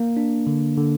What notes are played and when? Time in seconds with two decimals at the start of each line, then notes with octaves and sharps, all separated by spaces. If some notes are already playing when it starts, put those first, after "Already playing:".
Already playing: A#3
0.17 D4
0.47 D3
0.77 D3